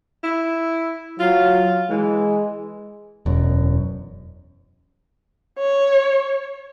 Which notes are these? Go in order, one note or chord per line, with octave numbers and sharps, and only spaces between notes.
E4
F#3 F4
E3 G#3
E1 F#2
C#5